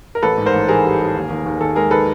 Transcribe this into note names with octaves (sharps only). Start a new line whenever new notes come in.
A#4
A1 A4 B4
G#2
A#4 C5
A1
E3 G#4 A#4
G3
G3
D#2
D#2
D#2
D#3 A4
G#3 G#4 A#4
D#3 A4 B4